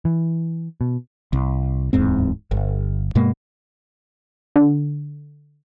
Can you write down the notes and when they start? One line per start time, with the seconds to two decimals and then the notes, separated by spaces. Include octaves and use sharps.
0.05 E3
0.81 B2
1.33 C2
1.93 D1 E2 G#2 C4
2.51 G1
3.15 G2 B2 G#3 A#3
4.56 D3